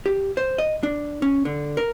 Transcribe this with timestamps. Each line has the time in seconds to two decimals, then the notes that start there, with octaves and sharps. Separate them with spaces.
0.06 G4
0.37 C5
0.58 D#5
0.83 D4
1.22 C#4
1.45 D3
1.77 A#4